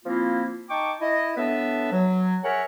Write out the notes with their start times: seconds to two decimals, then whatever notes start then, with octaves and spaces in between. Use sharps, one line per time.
0.05 F3 A#3 C4 E4 F4
0.70 D#4 G5 A5 C#6 D6
1.01 E4 D#5
1.37 A2 B3 D4 B4 E5
1.92 F#3
2.43 G#4 A#4 C#5 E5 F#5